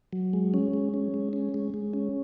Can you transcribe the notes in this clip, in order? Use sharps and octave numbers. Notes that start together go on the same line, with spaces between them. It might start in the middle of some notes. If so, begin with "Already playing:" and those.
F#3
G#3
C#4
G#3
C#4
G#3
C#4
G#3
G#3
C#4